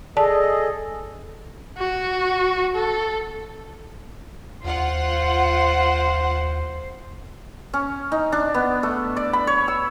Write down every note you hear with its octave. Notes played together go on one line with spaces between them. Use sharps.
G#4 A4 D5 D#5 A5
F#4
A4
D#2 F4 C5 F#5
C#4
D#4
D4
B3
A3
D5
B5
C#5
E6